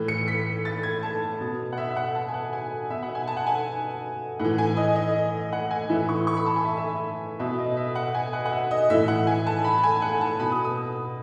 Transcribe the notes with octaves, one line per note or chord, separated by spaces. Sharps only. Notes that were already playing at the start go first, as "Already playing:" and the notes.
Already playing: A2 E3
C#7
B6
A6
G#6
A5
B2
F#5
E5
E5
F#5
A5
G#5
F#5
G#5
B2 E5
F#5
G#5
A5
F#5
G#5
A2 E3 F#5
G#5
D#5
D#5
F#5
G#5
A2 E3 E5
C#6
C#6
B5
A5
G#5
E5
E5
B2 E5
D#5
E5
F#5
G#5
F#5
F#5
E5
D#5
A2 E3 E5
F#5
G#5
A5
B5
A5
G#5
F#5
A5
B2 B5
D#6
D#6